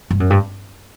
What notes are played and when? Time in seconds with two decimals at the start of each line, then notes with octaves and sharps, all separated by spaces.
0.11 G2
0.20 F#2
0.30 G2